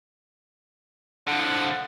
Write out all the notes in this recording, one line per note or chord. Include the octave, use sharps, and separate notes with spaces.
D3 F3 F#5